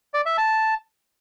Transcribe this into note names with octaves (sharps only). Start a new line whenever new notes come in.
D5
E5
A5